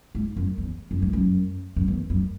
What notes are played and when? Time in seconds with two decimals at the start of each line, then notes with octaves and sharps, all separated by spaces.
0.15 G#2
0.36 F#2
0.58 E2
0.91 F#2
1.02 G#2
1.13 F#2
1.76 F#2
1.88 E2
2.10 F#2